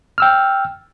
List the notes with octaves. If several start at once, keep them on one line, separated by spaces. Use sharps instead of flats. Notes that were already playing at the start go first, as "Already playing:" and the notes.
G5 E6 F6